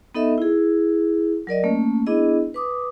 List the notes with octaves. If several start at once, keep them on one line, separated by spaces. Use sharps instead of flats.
B3 D#4 A4 D#5 E5
E4 G#4
F#3 A#4 D5 D#5
A3 A#3 C#4
B3 D4 E4 G#4 D#5
B4 D6 D#6